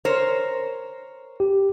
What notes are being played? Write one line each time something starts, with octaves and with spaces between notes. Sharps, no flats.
A#4 C5 C#5
G4